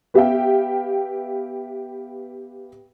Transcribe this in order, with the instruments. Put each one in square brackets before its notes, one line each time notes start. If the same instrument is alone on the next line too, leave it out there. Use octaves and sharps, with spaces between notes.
[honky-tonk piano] B3 G4 E5 F5 G5